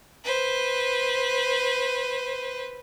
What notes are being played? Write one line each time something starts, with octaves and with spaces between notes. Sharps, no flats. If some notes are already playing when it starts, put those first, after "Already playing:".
B4 C5